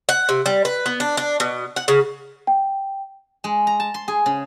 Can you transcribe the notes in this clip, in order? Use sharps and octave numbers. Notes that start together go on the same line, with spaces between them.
F#5
C3
G3
B4
B3
D4
D4
B2
F#5
C#3
G5
G#3
A#5
A5
C6
G#4
C#3